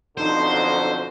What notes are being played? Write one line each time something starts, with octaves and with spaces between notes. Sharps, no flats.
B1 F2 D3 D#4 C5